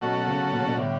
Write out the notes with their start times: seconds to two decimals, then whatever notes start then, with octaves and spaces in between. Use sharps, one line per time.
0.01 B2 F#3 A3 C#4 F#4 A4
0.27 C#3
0.52 B2
0.60 C#3
0.68 B2
0.77 A2 D3 G3